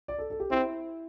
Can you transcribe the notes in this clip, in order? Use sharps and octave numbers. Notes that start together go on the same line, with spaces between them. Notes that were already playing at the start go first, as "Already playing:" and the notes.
D5
A4
A4
G4
C4 E4